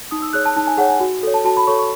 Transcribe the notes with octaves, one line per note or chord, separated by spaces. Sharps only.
D#4 D#6
E6
G#4 C#5 F#6
A5
D#4 A5
G#5
G#4 C#5 F#5
G#5
F#4
A4 C#5
A5
F#4 A5
B5
A4 C#5 C#6
C#6